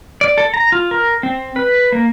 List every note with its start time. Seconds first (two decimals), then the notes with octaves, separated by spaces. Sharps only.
0.21 D5
0.38 A4
0.54 A#5
0.72 F4
0.91 A#4
1.23 C4
1.56 B4
1.92 A#3